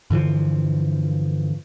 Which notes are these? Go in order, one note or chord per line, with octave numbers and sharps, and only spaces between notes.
G2 D3 E3 F3